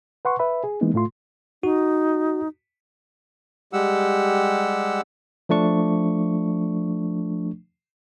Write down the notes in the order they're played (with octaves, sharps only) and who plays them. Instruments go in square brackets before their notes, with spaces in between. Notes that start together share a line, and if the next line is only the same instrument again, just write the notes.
[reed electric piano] B4 F#5 C6 C#6
B4 E5 B5
G#4
E3 G#3 A#3 B3 D#4
A2 A3 F4 C6
[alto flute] D#4 [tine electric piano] F#4
[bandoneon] G3 G#3 G4 F#5 E6
[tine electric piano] F3 A3 D4 C#6